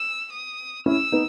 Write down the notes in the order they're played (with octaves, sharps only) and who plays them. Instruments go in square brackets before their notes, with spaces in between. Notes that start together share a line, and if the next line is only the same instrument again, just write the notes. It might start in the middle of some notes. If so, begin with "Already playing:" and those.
Already playing: [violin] E6
D#6
[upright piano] C#4 E4 [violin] E6
[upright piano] B3 D#4